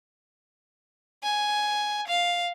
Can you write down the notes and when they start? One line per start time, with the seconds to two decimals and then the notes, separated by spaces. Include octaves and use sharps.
1.23 G#5
2.08 F5